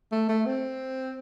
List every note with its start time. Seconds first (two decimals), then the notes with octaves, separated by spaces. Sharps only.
0.12 A3
0.29 A3
0.46 C4